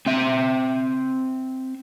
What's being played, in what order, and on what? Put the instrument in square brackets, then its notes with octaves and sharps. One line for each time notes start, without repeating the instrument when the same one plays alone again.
[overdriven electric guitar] C4 E5